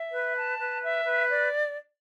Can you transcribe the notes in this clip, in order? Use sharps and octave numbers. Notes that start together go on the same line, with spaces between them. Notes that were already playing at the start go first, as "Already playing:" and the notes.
Already playing: E5
B4
A5
B4
E5
B4
D5